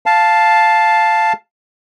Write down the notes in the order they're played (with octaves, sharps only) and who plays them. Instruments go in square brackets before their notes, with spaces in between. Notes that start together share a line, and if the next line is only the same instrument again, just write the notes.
[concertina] F5 A5